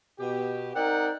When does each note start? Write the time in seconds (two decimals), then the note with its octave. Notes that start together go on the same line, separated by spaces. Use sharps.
0.19 B2 G4
0.75 C4 D#4 A#4 D5 F#5 G5